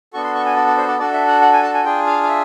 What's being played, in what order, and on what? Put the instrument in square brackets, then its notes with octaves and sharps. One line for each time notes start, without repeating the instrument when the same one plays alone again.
[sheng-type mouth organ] B3 D4 F#4 A4 C#6
C6
C#6
G#5
D5
D5
C5
D5
D4 F#4 A4 D5
E5
F#5
F#5
G#5
A5
G#5
D4 F4 G#4 G5
F5
F5
E5